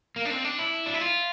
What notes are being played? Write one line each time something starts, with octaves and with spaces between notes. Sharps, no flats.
A#3
D4
C4
D4
E4
D4
E4
F4